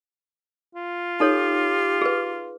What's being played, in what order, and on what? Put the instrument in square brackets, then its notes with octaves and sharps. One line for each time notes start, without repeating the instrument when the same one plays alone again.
[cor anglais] F4
[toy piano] D#4 A4 C#5 [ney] G4
[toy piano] G#4 B4